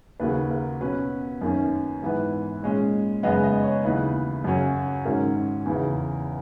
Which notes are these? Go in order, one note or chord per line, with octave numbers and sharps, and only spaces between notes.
D#2 C#3 F#3 A#3 B4
A#4
B2 F#3 C#4 B4
F#2 D#3 A#3 C#4
G#2 E3 B3
A#2 G#3 C#4
F#2 C#3 G#3 B3 D#5
D#5
C#5
D#2 C#3 E3 B3 B4
F#2 C#3 F#3 C#4
G#2 D#3 F#3 C#4 A#4
E2 C#3 E3